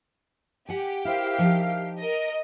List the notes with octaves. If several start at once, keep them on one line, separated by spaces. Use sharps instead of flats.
G4 F#5 G#5
E4 A#4 C5 E5 F5
F3 D#4
A#4 D#5